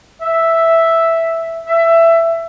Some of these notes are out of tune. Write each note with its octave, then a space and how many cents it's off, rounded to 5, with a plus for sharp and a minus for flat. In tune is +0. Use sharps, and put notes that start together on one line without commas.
E5 +0
E5 +15